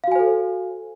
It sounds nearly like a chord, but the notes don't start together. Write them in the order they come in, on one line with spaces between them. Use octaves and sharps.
F5 F#4 G#5 C5 A4